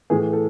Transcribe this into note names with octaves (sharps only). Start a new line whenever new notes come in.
A2 E3 G#4
A4